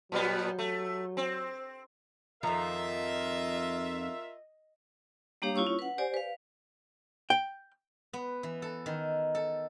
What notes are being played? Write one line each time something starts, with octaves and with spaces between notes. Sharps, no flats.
A#2 F#3 G3 B3
A3
C4
F2 D#3 F3 F4 A#4 D#5 E5 A#5
G3 A#3 D4 G4 C#5 F5
E4 F4 C#5 C#6 E6
C#4
B4 F#5
G4 C5 D5 G#5
B4 F5
G5
B3
E3
A4
D#3
A4